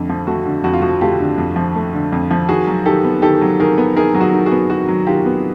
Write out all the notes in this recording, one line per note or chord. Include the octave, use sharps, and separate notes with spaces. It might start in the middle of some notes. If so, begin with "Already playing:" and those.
Already playing: F2 D3 A3
F3
A3 F#4
D3
F2 F#4
F4
F3 F#4
A3 F4 G4
D3
F2
F3
A3
D3
F2
F3
D#3 F#4 G#4
F#3
D#3 G4 A4
B3
D#3 G4 A4
F#3
D#3 G#4 A#4
B3
D#3 G#4 A#4
F#3
F#4 G#4
D#3
F#4 G#4
B3
D#3 F#4
F#3
D#3 F4 G4
B3